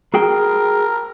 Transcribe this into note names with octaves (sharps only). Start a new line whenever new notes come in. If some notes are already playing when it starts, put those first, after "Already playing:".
F#4 G#4 A#4 G5